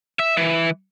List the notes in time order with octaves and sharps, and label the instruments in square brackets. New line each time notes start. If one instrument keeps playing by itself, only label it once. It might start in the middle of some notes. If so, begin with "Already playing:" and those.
[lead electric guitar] E5
E3